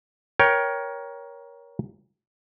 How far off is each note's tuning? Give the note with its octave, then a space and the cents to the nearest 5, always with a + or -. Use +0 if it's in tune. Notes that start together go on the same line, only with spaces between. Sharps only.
A#4 +20 C#5 +10 G5 +0